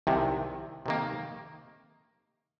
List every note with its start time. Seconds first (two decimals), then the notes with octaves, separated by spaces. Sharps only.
0.07 C2 C3 D#3
0.86 C3 D#3 A#3